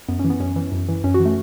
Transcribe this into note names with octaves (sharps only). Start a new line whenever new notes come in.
F#2 B3
C#4
E3
B3
F#2 C#4
E3
F#2
E3
F#2 C#4
F#4
E3
A3